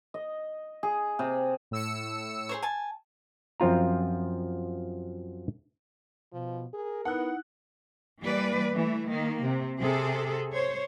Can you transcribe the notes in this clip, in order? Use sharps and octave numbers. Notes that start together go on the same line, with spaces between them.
D#5
G#4
C3
A2 E6 C#7
G#4 C5 C#5
G#5 A5
F#2 F3 C4 F4 A#5
B2 F3
G#4 A#4
B3 D#4 E4 F#5 F#6
E3 G3 A#3 B4 D5
E3 A3
D#3 A#3
C3
C3 G#4 A4
C5 C#5